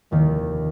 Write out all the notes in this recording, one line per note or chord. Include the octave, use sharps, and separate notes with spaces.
F1 D#2 D#3